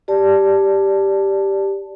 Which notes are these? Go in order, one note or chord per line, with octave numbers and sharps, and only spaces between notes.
G4 D5 A5